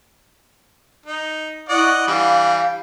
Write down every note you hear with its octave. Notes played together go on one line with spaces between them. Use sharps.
D#4
E4 D5 D#5 F#5 C#6
E3 G3 D4 F5